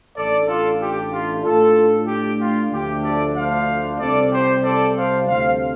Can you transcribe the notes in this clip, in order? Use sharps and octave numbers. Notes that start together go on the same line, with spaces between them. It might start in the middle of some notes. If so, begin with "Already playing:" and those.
A1 A2 A3 D4 A4 D5
F4 A4
G4
F4
A2 A3 D4 F4 A4
G4
F4
D2 D3 F3 A3 D4 G4
A4 D5
C5 F5
C2 C3 G3 C4 A4 D5
G4 C5
A4 D5
C5 F5
D2 C3 A3 C5 F5